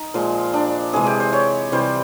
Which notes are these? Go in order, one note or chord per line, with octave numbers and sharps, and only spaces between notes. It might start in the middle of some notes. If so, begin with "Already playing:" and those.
Already playing: D#4
A#2 F3 G#3
D4
C3 E3 G#3 G#4
G4
C5
C#5
C3 E3 G3 C5